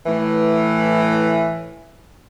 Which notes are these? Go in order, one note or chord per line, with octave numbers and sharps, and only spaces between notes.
A2 E3